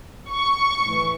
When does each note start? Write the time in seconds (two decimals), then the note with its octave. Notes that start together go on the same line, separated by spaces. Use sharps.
0.30 C#6
0.82 A2 E3